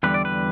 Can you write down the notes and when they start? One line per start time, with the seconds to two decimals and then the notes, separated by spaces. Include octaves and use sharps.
0.03 E2 D3 G3 B4
0.14 D5
0.25 B4